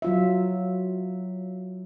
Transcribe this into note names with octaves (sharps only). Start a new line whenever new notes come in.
F#3 F4 E5